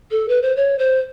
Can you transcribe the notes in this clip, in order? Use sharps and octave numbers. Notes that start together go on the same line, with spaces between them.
A4
B4
C5
C#5
C5